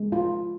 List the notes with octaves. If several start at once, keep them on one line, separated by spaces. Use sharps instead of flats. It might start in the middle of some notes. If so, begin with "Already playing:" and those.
Already playing: G#3
F4